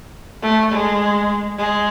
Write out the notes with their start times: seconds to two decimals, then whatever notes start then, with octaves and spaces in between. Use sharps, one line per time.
0.42 A3
0.72 G#3
1.58 G#3